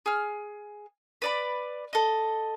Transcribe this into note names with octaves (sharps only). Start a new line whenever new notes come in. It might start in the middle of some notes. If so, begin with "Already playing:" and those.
G#4 F6
B4 D5 B5
A4 D#5